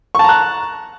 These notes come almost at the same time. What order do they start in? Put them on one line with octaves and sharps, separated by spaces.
C#6 A5 A#5 F#6